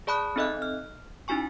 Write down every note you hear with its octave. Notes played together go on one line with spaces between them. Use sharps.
G#4 D5 A5 B5 D#6 F#6
C4 D#4 A4 D#5 E5 F#6
F6
C#4 D#4 E4 F#4 G#5 C#6